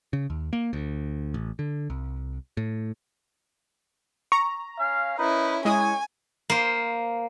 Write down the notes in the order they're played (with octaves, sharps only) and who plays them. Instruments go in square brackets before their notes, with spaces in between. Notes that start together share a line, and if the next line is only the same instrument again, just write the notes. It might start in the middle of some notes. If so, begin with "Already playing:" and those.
[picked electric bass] C#3
D#2
A#3
D2
A1
D3
C2
A2
[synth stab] A#5 [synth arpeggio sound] C#6
[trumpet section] C#4 F5
[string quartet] C#4 E4 [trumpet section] D#4 A#4 B4
[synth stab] G#3 E4 D#6 [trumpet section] C#5 [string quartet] G#5
[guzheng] A#3 C5